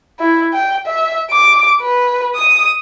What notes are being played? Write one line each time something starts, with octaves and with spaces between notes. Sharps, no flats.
E4
G5
E5
D6
B4
D#6